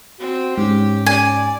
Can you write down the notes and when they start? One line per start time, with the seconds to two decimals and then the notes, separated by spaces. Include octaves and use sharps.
0.20 C4 F#4
0.58 G#2 C#4 G4
1.06 D5 G#5